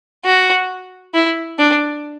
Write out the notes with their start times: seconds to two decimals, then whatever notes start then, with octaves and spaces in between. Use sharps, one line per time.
0.25 F#4
1.14 E4
1.59 D4